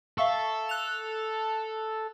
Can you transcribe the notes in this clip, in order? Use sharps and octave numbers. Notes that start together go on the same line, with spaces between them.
A4 E5 F5 C#6
F#6 F7